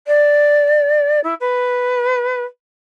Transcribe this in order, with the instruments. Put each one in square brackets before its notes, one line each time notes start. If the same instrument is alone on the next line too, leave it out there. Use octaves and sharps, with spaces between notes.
[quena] D5
E4
B4